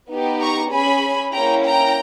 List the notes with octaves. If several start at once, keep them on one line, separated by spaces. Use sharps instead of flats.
B3 D#4 G4
A#5 C#6
C#4 G#4 G#5 B5
A#3 C#4 E4 G5 A#5
G5 A#5